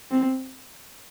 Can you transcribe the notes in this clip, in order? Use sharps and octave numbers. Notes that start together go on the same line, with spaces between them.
C4